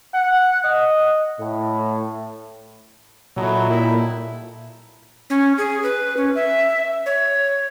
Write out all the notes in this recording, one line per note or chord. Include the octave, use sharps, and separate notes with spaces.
F#5
D#5
A2
A#2 F#3 D#4 E4 A4
G3 E4 G4
C#4
G#4
B4
C#4
E5
C#5